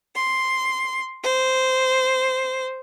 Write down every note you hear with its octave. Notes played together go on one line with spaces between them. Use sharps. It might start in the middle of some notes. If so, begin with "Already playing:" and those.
C6
C5